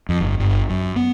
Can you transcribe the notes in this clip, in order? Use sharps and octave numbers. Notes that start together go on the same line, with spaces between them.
F2
G1
G1
F#2
B3